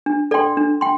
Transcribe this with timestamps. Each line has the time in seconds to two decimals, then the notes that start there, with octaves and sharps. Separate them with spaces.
0.06 D4
0.31 A4 D5 G5 C6
0.57 D4
0.81 G5 C6